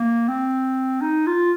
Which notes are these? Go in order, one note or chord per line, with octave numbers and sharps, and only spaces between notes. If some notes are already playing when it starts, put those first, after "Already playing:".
Already playing: A#3
C4
D#4
F4